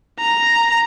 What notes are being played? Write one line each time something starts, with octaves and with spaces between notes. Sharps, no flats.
A#5